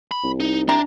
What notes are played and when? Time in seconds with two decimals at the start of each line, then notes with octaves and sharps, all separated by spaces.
0.11 B5
0.24 C2
0.40 D#4
0.69 C3 D4 A#5